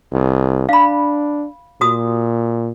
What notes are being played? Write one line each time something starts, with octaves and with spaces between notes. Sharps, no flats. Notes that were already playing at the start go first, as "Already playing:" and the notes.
C2
D4 F5 B5
A#2 F#4 D#6